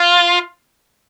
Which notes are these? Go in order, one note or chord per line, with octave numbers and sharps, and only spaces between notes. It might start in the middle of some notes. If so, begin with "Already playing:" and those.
Already playing: F4